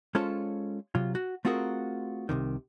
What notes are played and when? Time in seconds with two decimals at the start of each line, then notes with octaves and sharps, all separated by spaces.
0.15 G#3 C#4 F4 A4 C5 C#5
0.95 C3 F#3 F4
1.15 F#4
1.45 A3 C4 F4 F#4 G#4 A#4
2.29 C2 F2 C3 D#3